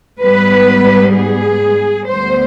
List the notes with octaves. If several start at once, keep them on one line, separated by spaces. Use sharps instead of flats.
G#2 G3 B3 B4
G#4
D2 D3 G3 B3 C5